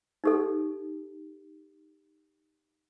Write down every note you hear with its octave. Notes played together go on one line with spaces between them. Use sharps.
D#4 G4 A4